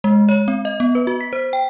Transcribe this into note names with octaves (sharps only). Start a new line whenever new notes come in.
G#3
C#5
C4
D#5
B3
B4
F#4
B6
C5
G5